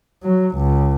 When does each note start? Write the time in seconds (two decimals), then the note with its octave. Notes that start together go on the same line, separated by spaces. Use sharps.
0.24 F#3
0.56 C#2